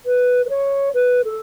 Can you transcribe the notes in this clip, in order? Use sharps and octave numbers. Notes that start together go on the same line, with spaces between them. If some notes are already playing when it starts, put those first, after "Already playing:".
B4
B4
C#5
B4
A4